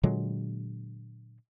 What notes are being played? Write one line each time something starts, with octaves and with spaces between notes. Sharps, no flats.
A#2 D3 F#3 G#3